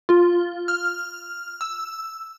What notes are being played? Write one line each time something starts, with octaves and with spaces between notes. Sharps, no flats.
F4
F6
E6